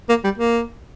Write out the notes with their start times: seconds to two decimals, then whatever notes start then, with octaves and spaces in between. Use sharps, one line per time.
0.09 A#3
0.24 G3
0.38 A#3